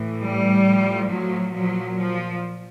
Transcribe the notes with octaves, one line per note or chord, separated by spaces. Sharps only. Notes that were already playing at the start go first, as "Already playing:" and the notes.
Already playing: A2 E3
G3
A2 F3
F#3
A#2 F3 F#3
F3